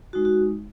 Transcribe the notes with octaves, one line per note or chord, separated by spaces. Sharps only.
G#3 D#4 F#4
F#4